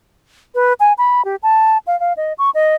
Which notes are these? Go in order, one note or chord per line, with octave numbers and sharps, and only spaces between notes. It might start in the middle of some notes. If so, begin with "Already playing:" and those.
B4
G#5
B5
G4
A5
F5
F5
D#5
C#6
D#5